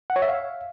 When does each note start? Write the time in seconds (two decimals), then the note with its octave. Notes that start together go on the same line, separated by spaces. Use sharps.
0.10 F#5
0.16 C#5
0.22 E5
0.28 F5